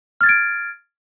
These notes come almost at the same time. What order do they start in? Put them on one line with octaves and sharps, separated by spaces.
F6 A6 G#6 D7